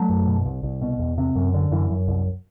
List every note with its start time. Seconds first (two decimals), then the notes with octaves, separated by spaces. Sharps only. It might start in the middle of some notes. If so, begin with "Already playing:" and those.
Already playing: F#3 A3
0.09 F#2
0.27 B2
0.45 C2
0.63 C2
0.82 B2
0.99 E2
1.18 C3
1.35 F#2
1.54 D3
1.71 F#2 E3
1.90 F#2
2.08 C2